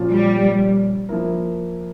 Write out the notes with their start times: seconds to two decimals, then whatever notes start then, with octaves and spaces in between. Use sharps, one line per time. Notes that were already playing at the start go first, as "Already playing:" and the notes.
Already playing: A#2 F3 C#4 F4
0.12 G3
1.09 F3 A#3 E4 A#4